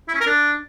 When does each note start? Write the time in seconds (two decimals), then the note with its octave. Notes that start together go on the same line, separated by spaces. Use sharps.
0.08 E4
0.14 C#4
0.21 A#4
0.27 D4